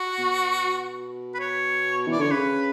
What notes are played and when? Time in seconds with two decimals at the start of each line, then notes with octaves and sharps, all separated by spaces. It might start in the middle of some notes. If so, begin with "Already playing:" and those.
Already playing: F#4
0.19 B2
1.34 B4
1.39 C#5
2.08 E3 D5
2.19 D3 C#5
2.31 C#3 B4